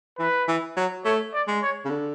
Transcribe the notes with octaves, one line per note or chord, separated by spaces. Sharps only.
E3 B4
E3
F#3
A3 C#5
D5
G#3
C#5
C#3
D3